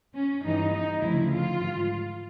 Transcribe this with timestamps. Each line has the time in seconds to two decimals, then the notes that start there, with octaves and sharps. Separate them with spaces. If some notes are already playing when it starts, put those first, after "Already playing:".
0.14 C#4
0.44 G2 E3 G3 D#4
0.73 D#4
1.02 D2 C#3 F3 E4
1.31 F4
1.60 G#2 E3 G3